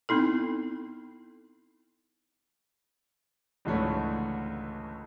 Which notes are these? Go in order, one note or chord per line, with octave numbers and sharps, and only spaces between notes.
B3 C4 D#4 E4 A4
C#2 G#2 D3 E3 A3 C#4